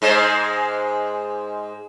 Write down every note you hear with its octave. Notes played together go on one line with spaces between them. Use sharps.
G#2 G#3 C5